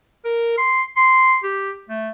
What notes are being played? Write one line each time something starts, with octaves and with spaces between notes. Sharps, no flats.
A#4
C6
C6
G4
A3